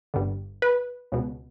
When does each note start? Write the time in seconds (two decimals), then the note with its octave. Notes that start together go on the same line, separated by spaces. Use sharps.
0.14 G1 G2 D3
0.62 B4
1.12 C#2 B2